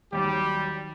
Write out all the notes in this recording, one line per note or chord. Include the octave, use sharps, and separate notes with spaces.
D#2 D#3 F#3 G3 G4